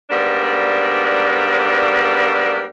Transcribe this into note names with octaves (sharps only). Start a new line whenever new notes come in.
G#2 G3 A#3 B3 D4